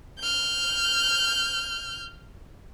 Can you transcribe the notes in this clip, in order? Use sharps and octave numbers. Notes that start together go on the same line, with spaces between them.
F6 G6